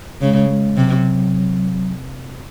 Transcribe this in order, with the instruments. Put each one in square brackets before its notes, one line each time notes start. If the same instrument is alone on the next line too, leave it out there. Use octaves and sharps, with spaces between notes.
[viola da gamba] C#3 [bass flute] G#3
[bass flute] G#3
[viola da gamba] C3 [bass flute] F#3